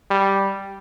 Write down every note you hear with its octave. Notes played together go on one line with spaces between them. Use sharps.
G3